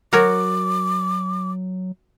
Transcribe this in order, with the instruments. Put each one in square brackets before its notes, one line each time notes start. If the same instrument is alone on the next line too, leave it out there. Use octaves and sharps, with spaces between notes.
[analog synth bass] F#3 [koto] F#4 A#4 C#5 [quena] D6